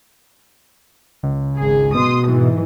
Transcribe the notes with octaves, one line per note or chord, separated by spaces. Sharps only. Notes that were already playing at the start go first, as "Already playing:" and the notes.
C#2
G#1 G#4
B2 C6 D#6
G#2 E3